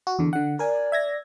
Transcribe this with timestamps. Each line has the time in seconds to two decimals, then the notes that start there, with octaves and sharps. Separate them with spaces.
0.07 F#4
0.19 E2 D3
0.33 D3 F#5
0.59 A#4 D5 G#5
0.92 E5 G#6 A#6